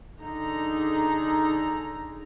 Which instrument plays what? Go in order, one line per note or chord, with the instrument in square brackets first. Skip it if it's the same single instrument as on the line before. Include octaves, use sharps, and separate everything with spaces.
[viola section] D3 D#4 G#4 A#5